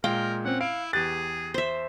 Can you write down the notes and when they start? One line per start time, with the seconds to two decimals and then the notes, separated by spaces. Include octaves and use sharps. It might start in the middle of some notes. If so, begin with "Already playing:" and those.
0.04 A#2 G#3 A#4 F5 G5
0.45 C4 C#4 F#5
0.61 E4 F5 D7
0.93 E2 G4 G#4 F#6 A6
1.54 C5 E5